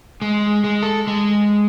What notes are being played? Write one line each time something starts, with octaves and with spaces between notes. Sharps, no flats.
G#3
G#3
A4
G#3